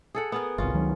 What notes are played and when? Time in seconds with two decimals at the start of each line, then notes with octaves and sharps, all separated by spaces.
0.15 G#4 A4 F#5
0.32 B3 G#4 A#4
0.58 G1 C2 C#4 F4
0.73 C#2 D#3 F#3